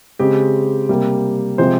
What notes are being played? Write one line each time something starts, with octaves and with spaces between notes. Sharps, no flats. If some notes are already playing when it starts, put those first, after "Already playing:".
C#3 G#3 C4 G4
C3 G3 A#3
C3 F3 G#3 C4 C5